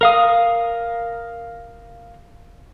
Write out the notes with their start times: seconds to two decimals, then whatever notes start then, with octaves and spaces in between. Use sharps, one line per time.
0.01 A#4 F5 D#6